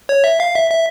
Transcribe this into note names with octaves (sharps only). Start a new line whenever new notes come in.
C#5
E5
F5
E5
E5